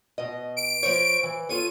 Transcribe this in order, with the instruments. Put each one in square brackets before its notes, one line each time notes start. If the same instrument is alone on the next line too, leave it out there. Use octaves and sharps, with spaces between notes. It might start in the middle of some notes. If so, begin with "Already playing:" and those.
[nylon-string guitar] B2 D#5
[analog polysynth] D7
[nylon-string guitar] F3 C5 C#5
E3
[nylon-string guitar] F4 A4 C#5 [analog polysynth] D#7